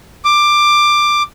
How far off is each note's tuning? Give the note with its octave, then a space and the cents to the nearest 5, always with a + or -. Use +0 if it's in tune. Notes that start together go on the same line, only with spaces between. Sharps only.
D6 +15